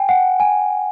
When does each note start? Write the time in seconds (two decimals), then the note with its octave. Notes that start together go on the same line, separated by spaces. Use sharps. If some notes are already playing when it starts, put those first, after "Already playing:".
Already playing: G5 G#5
0.09 F#5
0.40 G#5